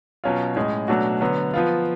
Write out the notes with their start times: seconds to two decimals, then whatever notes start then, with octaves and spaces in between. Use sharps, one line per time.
0.24 B2 F#3 C#4 F4
0.56 A2 G#3 C#4
0.88 B2 F#3 A3 D4 F#4
1.20 D3 F#3 B3
1.54 F3 B3 F4